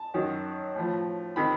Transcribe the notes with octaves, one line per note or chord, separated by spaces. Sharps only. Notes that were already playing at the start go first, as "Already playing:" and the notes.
Already playing: A5
F#2 D#3 F#3
A2 F3
C3 D#3 B5